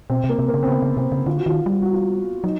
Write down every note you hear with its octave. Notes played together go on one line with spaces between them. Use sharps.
B2 C4
C3
A#3
C3
A#3
C#3
C4
C#3 B3
C#3
C3 C4
C#3
D3 F4
F#4
D#3 F4
F#4
G3 F4
F#4
F4
F#3 D#4